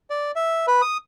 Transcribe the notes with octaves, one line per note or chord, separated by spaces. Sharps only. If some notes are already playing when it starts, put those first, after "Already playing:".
D5
E5
B4
D#6